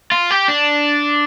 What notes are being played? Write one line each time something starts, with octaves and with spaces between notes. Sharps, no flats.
F4
G4
D4